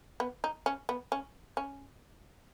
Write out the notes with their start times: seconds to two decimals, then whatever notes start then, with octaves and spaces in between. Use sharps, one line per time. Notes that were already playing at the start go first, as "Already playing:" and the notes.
0.20 B3
0.44 D#4
0.66 C#4
0.89 B3
1.12 C#4
1.57 C#4